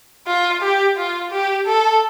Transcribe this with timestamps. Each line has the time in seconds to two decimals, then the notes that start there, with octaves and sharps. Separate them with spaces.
0.27 F4
0.62 G4
0.97 F4
1.31 G4
1.66 A4